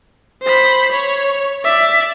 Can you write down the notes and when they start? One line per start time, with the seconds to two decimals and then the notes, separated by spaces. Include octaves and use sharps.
0.42 C5 B5
0.92 C#5
1.64 D5 E5